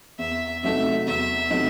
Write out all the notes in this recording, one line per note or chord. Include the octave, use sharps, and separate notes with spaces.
E2 E5
C3 F#3 A3 D#4 E5
E2 E5
C3 F#3 A3 D#4